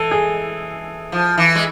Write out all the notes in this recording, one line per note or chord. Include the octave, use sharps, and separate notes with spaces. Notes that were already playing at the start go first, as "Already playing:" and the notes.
Already playing: E3 A4
G#4
F3
E3
G#3